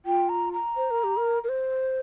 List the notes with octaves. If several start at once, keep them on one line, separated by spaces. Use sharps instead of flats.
F4 G5
A#5
A#5
C5
A#4
G4
A#4
A#4
C5